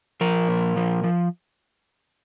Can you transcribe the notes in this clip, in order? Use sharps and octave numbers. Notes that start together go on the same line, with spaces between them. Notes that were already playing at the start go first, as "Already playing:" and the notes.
F3 A#4
A#2
F3
F3